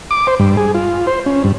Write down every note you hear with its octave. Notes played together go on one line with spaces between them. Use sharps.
D6
C5
G2
G#4
F4
C5
C#4
G2